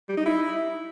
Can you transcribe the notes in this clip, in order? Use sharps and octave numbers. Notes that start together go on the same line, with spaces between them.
G3
D#4
E4